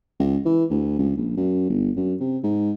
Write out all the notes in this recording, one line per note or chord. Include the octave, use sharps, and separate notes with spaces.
C#2
E3
D2
C#2
A#1
F#2
G1
F#2
C3
G#2